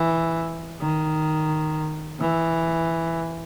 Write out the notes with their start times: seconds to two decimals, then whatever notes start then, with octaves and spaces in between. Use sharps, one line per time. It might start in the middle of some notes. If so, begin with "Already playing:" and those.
Already playing: E3
0.81 D#3
2.20 E3